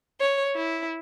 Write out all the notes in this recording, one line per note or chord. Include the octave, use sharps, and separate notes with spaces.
C#5
E4